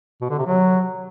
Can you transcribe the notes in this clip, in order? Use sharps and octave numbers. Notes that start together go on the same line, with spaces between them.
B2
D3
C3
F#3